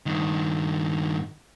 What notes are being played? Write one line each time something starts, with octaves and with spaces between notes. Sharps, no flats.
G2 D#3